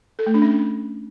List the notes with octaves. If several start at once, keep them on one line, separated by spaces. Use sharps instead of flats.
A4
A3
D4
C#4